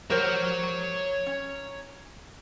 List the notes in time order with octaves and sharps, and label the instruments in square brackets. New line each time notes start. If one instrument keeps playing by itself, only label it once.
[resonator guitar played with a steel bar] G4 A#4 C5 [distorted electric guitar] C#5 A#5
[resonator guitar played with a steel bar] C#4